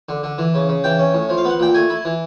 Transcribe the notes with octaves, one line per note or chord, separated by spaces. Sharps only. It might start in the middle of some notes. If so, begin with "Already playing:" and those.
D3
D3
E3
C#3
C#3
E3 G5
C#4
A2
F3
F5
B3
F#5
A#2 G5
A3 G#5
E4
E3